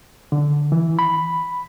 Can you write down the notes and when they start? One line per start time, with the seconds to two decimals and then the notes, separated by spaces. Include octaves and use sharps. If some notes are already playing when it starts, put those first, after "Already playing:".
0.32 D3
0.72 E3
0.99 B5